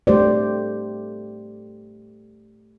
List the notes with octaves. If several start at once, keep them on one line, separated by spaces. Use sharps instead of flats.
A3 G4 C5 D5